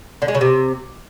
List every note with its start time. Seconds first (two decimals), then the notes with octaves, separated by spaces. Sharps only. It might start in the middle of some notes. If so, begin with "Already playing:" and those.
0.22 D3
0.28 G#3
0.35 C#3
0.41 C3